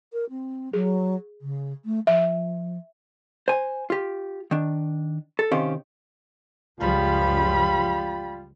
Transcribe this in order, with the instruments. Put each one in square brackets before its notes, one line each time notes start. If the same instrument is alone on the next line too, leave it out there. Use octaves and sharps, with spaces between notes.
[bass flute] A#4
C4
[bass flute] F#3 [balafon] G#4
[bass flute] C#3
A3
[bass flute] F3 [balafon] E5
[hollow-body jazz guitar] C5 G#5
F4 G4
D#3 D4
A4
C3 D#3 C#4 G4 C5 F5
[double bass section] C#2 F#2 F3 [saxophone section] G3 F4 [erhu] B5